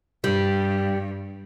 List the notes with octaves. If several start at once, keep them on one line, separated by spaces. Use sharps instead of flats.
G2 G3